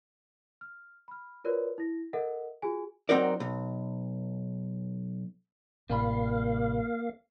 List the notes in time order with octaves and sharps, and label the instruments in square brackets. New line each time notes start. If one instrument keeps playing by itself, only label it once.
[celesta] F6
B5 F6
F4 F#4 A#4 B4 C#5 D5
E4 A#6
A4 A#4 D#5 E5 F#5
F4 F#4 G#4 G#5
[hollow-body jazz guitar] F#3 C4 D#4 F#4 A#4 D5
B1
[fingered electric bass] A1 A2 [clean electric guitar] C3 G3 B5 [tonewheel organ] A#3 F5